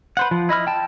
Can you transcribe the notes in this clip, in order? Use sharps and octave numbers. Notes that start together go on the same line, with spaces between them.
B4 C5 F#5
F3
E4 D#5 B5 F6
G5 A5